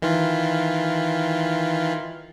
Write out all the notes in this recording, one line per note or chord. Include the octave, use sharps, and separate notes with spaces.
D#3 E3 F4